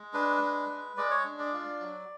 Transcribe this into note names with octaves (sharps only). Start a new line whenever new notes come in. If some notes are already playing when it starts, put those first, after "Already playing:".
Already playing: G#3
D4 B4
G#3
G#3
G#3 D5
C#5
D4
D5
F4
F#3